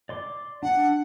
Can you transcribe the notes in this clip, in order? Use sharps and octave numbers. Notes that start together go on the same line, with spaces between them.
D5 C6 D6
D4 F#5